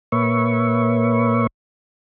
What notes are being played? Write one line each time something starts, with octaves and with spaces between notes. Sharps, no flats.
A#2 A#3 B4 C#5 E5 C#6